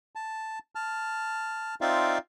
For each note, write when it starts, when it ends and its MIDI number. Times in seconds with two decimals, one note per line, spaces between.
0.15 0.59 81
0.75 1.75 81
0.75 1.75 89
1.81 2.18 60
1.81 2.18 63
1.81 2.18 65
1.81 2.18 74
1.81 2.18 76
1.81 2.18 77